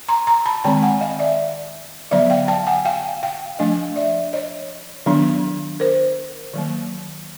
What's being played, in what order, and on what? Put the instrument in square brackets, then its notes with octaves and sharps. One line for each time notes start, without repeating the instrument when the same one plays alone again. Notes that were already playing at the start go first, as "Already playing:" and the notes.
[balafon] A#5 C6
A#5 C6
A5 B5
D#3 G#3 C4 G5 A5
F#5 G#5
D#5 F5
D5 E5
D3 F#3 B3 D5 E5
F5 G5
G5 A5
F#5 G#5
F5 G5
F5 G5
F3 A3 D4 D#5 F5
D5 E5
C#5 D#5
D#3 F#3 B3 D4
A#4 C5
D#3 F#3 A#3